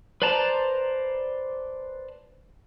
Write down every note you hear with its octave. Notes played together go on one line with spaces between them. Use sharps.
B4 C5 D5 A5 A#5